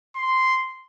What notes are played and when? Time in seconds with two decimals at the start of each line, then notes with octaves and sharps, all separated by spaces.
0.16 C6